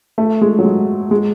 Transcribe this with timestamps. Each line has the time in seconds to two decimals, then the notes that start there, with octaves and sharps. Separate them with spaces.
0.18 A3
0.41 G#3
0.59 F#3
0.64 G#3
1.11 G#3